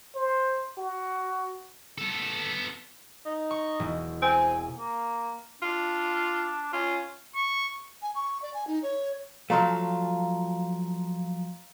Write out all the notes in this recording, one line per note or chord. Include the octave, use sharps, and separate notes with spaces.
C5
F#4
B3 A4
D#4
C#6
E1
C4 G#5
A#3
D4 F4
C#4 F4
C#6
G#5
C#6
D5
G#5
D#4
C#5
F3 F#3 A3 F5 A#5 C6